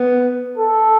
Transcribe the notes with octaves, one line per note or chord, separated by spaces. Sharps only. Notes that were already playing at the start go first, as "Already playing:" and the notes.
Already playing: B3
A4